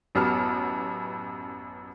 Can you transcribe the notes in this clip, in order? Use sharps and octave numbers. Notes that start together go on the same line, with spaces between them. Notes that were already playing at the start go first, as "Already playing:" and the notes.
A1 F#2 B3 G4 A5 F6